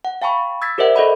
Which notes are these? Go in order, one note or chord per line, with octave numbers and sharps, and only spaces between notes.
F#5
F5 G5 A5 B5 C#6
E6 G#6 A6 B6
G4 A#4 C5 D5 E5 F#5
A4 D5 D#5 F#5 B5